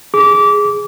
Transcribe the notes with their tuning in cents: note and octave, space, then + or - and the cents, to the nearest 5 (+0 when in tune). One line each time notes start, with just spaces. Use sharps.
G#4 +0 D6 -20